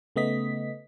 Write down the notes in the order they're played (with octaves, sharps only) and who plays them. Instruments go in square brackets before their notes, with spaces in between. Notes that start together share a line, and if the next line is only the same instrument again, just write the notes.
[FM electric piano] C#3 A3 B3 D#5 B6